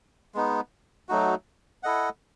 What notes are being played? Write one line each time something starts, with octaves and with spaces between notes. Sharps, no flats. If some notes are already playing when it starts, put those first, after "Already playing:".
G#3 B3 D#4
F#3 A3 D#4 F#4
E4 A4 D#5 F#5